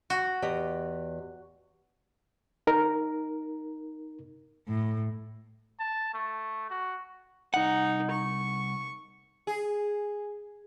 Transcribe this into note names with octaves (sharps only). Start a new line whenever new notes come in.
F#4
E2 G4 D#5
D#4 A#4
A2
A5
A3
F#4
C2 D#4 F#5
C#6
G#4